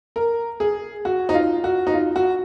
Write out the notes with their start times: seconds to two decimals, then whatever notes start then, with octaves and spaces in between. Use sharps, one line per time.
0.16 A#4
0.60 G#4
1.05 F#4
1.29 D#4
1.34 F4
1.64 F#4
1.87 D#4
1.94 F4
2.16 F#4